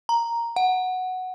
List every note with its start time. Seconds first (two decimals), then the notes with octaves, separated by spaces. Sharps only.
0.09 A#5
0.56 F#5